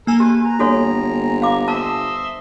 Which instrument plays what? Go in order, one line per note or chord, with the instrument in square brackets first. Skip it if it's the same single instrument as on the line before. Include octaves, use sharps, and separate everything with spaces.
[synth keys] A#3 G#5 [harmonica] A4 A#4
[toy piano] G4 [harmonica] B4
[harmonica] A#5
[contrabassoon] G1 [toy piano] F#4 A4 C#5
[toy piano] F5 D6
[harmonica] C5 D#5 E5 [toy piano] A5